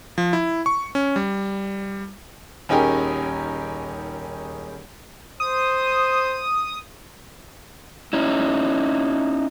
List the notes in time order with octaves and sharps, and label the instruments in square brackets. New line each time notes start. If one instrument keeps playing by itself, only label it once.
[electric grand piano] F3
E4
C#6
C#4
G3
[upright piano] D#1 C#4 D#4 G4 G#4 A#4
[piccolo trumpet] C5 [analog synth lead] D#6
[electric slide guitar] C#4 D#4 E4